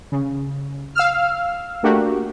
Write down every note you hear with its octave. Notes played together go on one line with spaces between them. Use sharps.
C#3
F5 E6 F6
A3 A#3 D4 F#4 G4